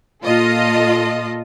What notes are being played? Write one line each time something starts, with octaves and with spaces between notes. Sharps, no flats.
A#2 F4 A4 D#5